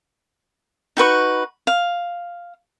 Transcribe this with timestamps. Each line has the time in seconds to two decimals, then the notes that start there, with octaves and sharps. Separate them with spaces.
0.97 D#4 F#4 B4 C#6
1.67 F5